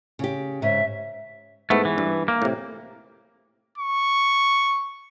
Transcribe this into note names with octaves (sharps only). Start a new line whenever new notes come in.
C#3 G4
G#2 C#3 E5
G#2 A3 B3 E4
E3
G2
A#3
A2 C3
C#6